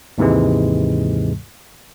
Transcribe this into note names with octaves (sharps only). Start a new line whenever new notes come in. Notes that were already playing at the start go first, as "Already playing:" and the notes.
D#2 G#2 C3 E3 G#3